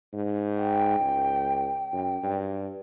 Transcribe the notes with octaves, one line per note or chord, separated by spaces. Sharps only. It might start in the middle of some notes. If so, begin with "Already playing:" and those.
G#2
G5
C#2
F#2
G2